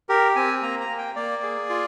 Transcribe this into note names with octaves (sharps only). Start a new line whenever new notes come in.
G4 A#4
C4 G#5
A#3 A#5
A#5
A#3
G5
A#3 D5
G#4
F4